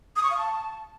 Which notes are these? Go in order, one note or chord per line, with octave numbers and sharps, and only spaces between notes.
D#6
C#6
F5
A5